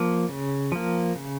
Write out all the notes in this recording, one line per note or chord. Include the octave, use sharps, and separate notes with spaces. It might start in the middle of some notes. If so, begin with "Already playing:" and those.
Already playing: F3 A#3
C#3
F3 A#3
C#3